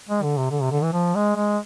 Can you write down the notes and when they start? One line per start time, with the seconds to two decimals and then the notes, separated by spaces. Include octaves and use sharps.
0.09 G#3
0.23 D3
0.37 C3
0.51 D3
0.62 C3
0.72 D3
0.83 E3
0.93 F3
1.15 G#3
1.36 G#3